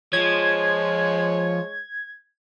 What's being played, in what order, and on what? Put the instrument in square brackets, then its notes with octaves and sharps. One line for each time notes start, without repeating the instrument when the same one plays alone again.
[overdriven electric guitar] F3 [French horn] G#3 [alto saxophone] C#5 [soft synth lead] G#6